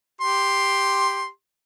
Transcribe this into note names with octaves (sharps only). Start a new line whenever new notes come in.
G4 C6